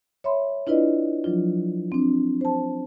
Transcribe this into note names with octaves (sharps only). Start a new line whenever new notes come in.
C#5 E5 B5 C6
D4 E4 F4 B4 D5 D#5
F3 F#3 D4 F4
C4 D4
C5 A5